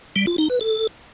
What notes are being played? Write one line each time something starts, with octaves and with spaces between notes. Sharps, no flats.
G3
F4
D#4
B4
A4